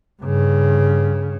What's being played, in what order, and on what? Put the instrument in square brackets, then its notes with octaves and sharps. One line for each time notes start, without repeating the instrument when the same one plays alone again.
[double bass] G2 C#3